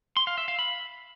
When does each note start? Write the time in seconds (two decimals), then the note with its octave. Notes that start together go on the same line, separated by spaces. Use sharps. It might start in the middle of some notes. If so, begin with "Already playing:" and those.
0.17 C6
0.27 F5
0.38 E5
0.48 F5
0.59 B5